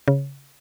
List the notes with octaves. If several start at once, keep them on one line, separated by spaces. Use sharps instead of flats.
C#3